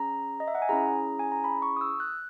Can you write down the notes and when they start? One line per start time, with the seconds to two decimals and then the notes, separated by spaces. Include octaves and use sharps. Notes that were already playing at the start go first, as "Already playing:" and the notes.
Already playing: C#4 G#4 A#5
0.40 D#5
0.48 E5
0.55 F#5
0.62 G#5
0.69 C#4 E4 G#4 A#5
1.19 G#5
1.32 A#5
1.44 B5
1.62 C#6
1.77 D#6
1.81 E6
2.00 F#6